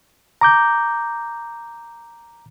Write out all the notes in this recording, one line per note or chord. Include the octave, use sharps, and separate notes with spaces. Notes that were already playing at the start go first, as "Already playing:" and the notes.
A#5 D6 G6